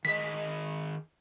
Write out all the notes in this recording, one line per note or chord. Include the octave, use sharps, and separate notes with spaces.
D#3 G#4 D#5 B6